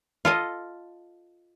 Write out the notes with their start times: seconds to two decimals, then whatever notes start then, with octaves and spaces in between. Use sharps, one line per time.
0.25 F4 A4 D#5